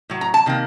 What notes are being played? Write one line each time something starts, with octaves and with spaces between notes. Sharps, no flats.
A2 F#3
A#5
A5
C3 D#3 A#3